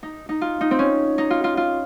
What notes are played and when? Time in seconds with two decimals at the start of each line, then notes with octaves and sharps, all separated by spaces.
0.03 D#4
0.29 D#4
0.41 F4
0.61 D#4
0.71 C4
0.79 C#4
1.18 D#4
1.30 F4
1.44 F4
1.57 F4